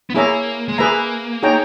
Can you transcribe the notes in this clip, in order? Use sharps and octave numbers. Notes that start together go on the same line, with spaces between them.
B3
A#3 E4 G#4 C#5 E5 A#5
G#3
A#3 G#4 B4 E5 A#5
D#4 G#4 C#5 G5 A#5